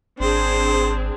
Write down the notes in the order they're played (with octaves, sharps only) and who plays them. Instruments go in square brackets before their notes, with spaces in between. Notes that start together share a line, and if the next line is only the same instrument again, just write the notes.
[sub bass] G#1 [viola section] C4 D4 G#4 [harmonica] C5